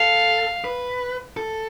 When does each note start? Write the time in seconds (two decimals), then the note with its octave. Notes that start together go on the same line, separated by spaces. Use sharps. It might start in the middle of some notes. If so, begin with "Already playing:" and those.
Already playing: A4 F5
0.65 B4
1.37 A4